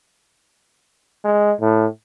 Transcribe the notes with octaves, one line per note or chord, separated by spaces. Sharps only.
G#3
A2